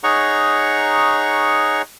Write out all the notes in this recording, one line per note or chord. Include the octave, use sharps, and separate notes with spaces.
D#4 G#4 C#5 F#5 A#5 C#6